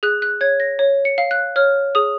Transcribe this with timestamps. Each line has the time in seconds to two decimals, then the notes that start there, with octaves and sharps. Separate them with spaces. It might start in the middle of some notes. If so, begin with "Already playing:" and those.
0.03 G#4 F#6
0.22 F#6
0.41 C#5 G#6
0.60 A#6
0.79 C#5
1.05 C#7
1.18 F5
1.31 F#6
1.56 C#5 F6
1.95 G#4 D#6